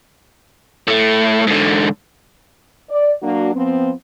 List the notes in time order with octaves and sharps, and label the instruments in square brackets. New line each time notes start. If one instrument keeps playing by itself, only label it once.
[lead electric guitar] A2 A3
G#2 D3
[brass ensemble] D5
F#3 A#3 D4 F#4
F3 B3 C4